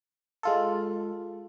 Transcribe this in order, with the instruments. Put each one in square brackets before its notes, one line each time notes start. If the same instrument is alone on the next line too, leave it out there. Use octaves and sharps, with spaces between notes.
[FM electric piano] G#3 F4 A4